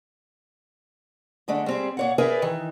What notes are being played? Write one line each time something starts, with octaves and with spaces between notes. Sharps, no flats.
D3 G#3 A3 D4
G3 C4 G#4
A#2 C#5 F#5
G#4 A#4 B4 D5 E5 G#5
D#3 E3